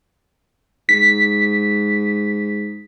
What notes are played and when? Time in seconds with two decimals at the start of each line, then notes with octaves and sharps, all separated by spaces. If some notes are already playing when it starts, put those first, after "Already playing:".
0.89 G#2 B6